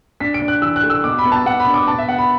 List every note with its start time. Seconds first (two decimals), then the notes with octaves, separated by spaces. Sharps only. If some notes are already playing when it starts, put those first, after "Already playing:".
0.20 D4 B6
0.34 D7
0.42 D4
0.48 F#6
0.62 E3 E6
0.76 F#6
0.83 A3
0.90 E6
1.04 B2 D6
1.19 B5
1.25 B3
1.32 A5
1.46 B3 F#5
1.60 B5
1.67 D4
1.74 D6
1.88 B3 A5
1.98 E5
2.08 B3 F#5
2.18 B5